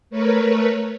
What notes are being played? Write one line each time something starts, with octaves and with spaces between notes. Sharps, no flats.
A3 A#4 B4 C#5